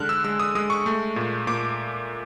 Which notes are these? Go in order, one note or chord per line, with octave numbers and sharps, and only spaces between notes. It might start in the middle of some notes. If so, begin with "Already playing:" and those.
Already playing: D3 G#3 F6 F#6
E6
G#3 E6
D#6
G#3 D#6
C#6
A3
A#2
A#2 D6